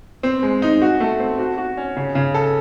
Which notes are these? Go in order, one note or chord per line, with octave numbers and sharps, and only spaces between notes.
C4
G#3
D#4
F#4
A3
C4
F#4
F#4
C#4
C#3
C#3
A4